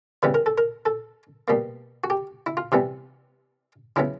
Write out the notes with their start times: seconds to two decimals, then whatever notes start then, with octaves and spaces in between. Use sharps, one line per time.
0.23 C#3 E3 G3 B3 B4
0.34 A#4
0.46 A4
0.58 A#4
0.86 A4
1.48 B2 G3 A#3
2.04 F#4
2.10 G4
2.46 E4
2.57 F4
2.72 C3 E3 G3 B3
3.96 C#3 F#3 B3 E4